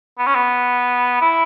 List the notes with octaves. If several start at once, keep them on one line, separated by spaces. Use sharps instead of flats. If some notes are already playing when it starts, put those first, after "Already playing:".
B3
C#4
B3
E4